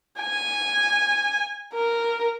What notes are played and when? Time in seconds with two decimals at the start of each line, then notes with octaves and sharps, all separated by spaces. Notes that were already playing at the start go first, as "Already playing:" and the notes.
0.20 G#5
1.74 A#4